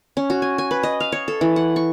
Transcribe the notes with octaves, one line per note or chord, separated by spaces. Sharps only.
C#4
F#4
G#5
G#5
B4
D#5
F5
C#5
A4
E3
F#5
C#6